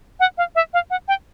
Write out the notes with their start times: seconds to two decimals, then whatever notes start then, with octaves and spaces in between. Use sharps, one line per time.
0.20 F#5
0.38 F5
0.56 E5
0.74 F5
0.90 F#5
1.08 G5